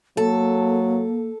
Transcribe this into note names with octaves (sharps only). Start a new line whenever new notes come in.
F#3 A#3 A4